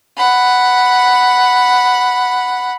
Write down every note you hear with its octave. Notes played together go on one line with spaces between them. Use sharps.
F#5 B5